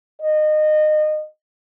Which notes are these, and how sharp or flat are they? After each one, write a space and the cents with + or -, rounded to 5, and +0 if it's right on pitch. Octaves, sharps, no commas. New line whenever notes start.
D#5 -25